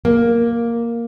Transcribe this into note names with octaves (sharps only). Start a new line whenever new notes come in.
A#3